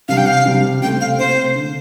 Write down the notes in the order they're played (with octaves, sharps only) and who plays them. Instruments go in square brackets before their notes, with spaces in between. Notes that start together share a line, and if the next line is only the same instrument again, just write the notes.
[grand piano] C3 G3 D4 [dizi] F5
[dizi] G5
F5
[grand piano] C3 G3 D4
[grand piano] C3 A3 C4 [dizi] G5
[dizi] F5
[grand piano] C3 A3 C4 [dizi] C5
[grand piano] D3 A3 D4